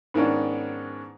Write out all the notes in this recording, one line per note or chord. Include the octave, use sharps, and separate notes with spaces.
G#2 D#3 B3 C#4 D4